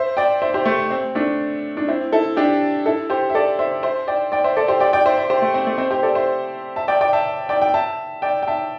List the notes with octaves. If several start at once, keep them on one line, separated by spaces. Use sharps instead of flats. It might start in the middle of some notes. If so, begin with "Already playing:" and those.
Already playing: C5 E5
D5 G5
C5 E5
G4 C5
A3
C4
A3 D4
D4
C4 E4
E4 A4
D4 G4
E4 A4
G4 C5
E5
A4 D5
C5 E5
C5 E5
D5 G5
D5 G5
C5 E5
A4 D5
G4 C5
D5 G5
D5 G5
C5 E5
C5 E5
G4 C5
A3
C4
A3
C4
G4 C5
A4 D5
C5 E5
E5 A5
D5 G5
D5 G5
E5 A5
D5 G5
G5
E5 A5
D5 G5
G5
E5 A5